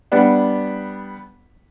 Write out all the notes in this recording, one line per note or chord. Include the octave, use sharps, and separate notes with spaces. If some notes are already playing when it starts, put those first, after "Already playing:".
G3 B3 D4 F#5